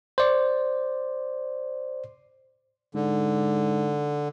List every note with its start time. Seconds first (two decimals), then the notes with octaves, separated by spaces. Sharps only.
0.18 C5 D5
2.95 G#2 D3